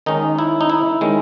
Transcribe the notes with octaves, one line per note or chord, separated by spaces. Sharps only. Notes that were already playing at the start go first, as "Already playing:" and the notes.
D#3 G#3 C#4 D#4
E4
D#4
E4
D#3 G#3 C#4